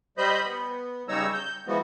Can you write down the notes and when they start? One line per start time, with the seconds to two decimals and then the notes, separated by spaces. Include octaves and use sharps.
0.18 G3 C5 D#5 B5 G6
0.45 B3
1.09 C#3 G3 D#4 C#5 A#5 E6
1.33 G6
1.67 E3 F3 G#3 B3 F#4